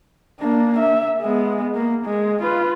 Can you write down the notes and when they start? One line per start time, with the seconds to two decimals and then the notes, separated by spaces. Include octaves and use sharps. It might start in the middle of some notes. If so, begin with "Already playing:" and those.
0.40 A#3 D4
0.78 E5
1.21 G#3 B3
1.74 A#3
2.06 G#3
2.42 F4 B4